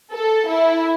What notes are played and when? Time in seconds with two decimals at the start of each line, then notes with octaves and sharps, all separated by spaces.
0.12 A4
0.48 E4